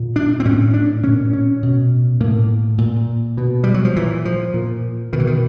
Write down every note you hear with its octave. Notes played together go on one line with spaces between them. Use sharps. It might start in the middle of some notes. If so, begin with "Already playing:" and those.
Already playing: A#2
D4
C4
A2 C#4
D4
A#2 C#4
C#4
B2
A2 A#3
A#2
B2
G3
F#3
F3
A#2 E3
F3
A#2
B2 D#3
E3
D#3